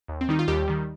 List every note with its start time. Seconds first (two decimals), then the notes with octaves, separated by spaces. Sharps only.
0.08 D#2
0.21 C4
0.29 D#3 G3 D#4
0.39 F4
0.48 D#2 G3 G4
0.68 D#3 G3